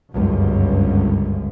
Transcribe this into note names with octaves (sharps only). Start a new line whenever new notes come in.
G1 C#2 F#2